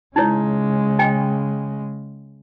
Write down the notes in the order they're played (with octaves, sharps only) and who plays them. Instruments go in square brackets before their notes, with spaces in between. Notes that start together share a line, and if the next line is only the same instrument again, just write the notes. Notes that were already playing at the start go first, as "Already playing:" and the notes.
[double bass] C#3 G#3 [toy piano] D#4 E4 C#5
[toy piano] D#5 G5 G#5